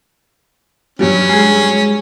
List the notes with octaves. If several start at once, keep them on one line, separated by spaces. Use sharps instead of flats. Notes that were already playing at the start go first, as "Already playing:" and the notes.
G2 F#3 G3 C#4
G#3 G#4